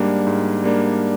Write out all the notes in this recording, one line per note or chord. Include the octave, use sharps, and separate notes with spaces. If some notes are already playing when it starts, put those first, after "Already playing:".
Already playing: G#2 G3 A#3 D4
G#2
G3 A#3 D4